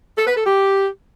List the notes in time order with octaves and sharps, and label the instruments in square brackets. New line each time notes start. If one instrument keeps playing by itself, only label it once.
[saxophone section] A4
B4
A4
G4